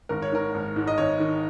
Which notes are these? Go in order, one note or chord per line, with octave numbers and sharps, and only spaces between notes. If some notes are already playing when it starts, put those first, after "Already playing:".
G#1 A#4
C#5
D#3 A#4
G#1
G#2
D#5
G#1 C#5
D#3